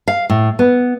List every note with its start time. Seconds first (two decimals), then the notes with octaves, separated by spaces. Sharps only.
0.08 F5
0.30 A2
0.59 B3